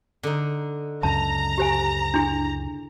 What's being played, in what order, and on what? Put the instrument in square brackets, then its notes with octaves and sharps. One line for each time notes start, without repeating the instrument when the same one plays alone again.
[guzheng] D3 D#4
[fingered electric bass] C#2 F#2 C#3 [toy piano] A5 [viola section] A#5
[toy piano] G4 C5 G#5
D4 E4 G#4